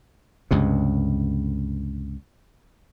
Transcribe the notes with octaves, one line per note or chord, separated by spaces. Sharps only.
C#2 G2 C3